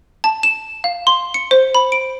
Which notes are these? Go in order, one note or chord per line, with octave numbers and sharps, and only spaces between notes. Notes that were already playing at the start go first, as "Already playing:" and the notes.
A5
E7
F5
C6
C#7
C5
B5
D7